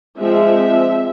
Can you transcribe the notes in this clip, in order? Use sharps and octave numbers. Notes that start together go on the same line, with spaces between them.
F3 G#3 C4 E5